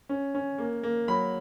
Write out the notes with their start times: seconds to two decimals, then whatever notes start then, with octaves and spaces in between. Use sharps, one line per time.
0.09 C#4
0.34 C#4
0.58 A#3
0.83 A#3
1.08 F#3 B5